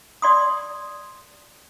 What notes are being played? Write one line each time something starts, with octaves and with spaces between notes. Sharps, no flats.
D5 C6 D#6